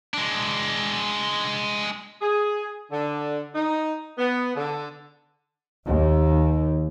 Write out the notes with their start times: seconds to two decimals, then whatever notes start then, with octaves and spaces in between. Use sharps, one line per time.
0.14 G#3 D4
2.21 G#4
2.90 D3
3.54 D#4
4.18 B3
4.55 D3
5.86 D#2